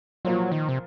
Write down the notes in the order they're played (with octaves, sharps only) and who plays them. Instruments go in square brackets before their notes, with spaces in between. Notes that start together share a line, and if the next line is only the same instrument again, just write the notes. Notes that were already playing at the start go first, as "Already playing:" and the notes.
[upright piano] A#2 F3 A#3 F4 C5 [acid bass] F#3
[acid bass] D#3
C3